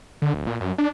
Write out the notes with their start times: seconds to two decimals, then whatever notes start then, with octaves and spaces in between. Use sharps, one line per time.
0.22 D3
0.34 D1
0.47 A#2
0.61 F#2
0.78 D4